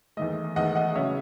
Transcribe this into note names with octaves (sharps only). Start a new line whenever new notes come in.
E2 D#3 A3 D#5
E2 D#3 A3 D#5 F#5
D#5 F#5
C#3 F#3 C#4 C#5 E5